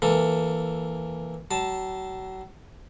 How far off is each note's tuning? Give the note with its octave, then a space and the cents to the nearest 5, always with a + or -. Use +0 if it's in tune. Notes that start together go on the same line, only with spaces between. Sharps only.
E3 +0 A#3 +0 A4 +15
F#3 +35 A5 +0